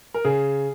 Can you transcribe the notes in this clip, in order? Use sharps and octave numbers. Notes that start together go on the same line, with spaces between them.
A#4
C#3 G#4